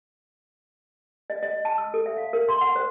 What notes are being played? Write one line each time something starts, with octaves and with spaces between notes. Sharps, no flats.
D#5
D#5
A5
E6
A4
E5
F5
A#4
C6
F#5
C5